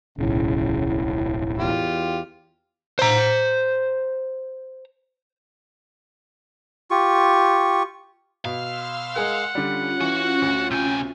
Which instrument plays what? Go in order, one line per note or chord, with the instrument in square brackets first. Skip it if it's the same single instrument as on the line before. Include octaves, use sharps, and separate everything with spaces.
[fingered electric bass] D1 B1 [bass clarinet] A2 [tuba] C#3
[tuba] E2 [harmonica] F4 G4
[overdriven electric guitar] C5 A#5
[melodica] F4 G4 C#6
[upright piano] B2 [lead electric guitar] F5 [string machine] C6 E6 F6
[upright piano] G#3 G#4 A#4 [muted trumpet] F#5
[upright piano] D3 G3 [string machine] C#4 F4
[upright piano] E3 [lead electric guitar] F#4
[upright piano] D2
[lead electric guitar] C3 G#5 [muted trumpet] G5